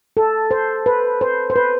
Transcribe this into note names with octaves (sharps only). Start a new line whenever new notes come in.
A4
C5
B4
C5
C5
B4